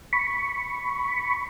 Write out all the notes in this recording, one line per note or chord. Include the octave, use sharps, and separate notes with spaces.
B5 C#6